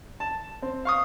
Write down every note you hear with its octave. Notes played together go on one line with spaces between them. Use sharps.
A5
C4
F5 C#6 D#6